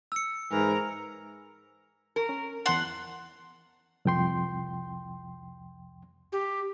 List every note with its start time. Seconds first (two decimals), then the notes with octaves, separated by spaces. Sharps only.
0.12 E6 C#7
0.51 G#2 E3 A#4
2.16 A#4
2.29 C#4
2.66 E2 F#5 A5 C6
4.05 C2 F2 G5 C6
6.32 G4